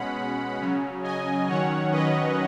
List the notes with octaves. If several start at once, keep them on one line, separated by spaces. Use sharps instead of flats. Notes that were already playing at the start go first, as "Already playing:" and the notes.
Already playing: B2 G#3 C#4 F#5 B5
C#3 F#3 C#4
D#5 G#5
D#3 F#3 C#4 C#5 F#5
B4 D#5